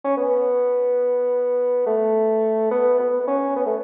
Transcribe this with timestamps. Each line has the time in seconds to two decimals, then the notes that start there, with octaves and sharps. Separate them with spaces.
0.05 C#4
0.17 B3
1.87 A3
2.71 B3
3.00 B3
3.21 B3
3.28 C#4
3.56 B3
3.66 A3